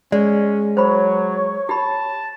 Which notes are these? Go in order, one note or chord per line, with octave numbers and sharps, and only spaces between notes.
G#3 C#4 D5
F#3 C5 C#5 B5
G4 A5 B5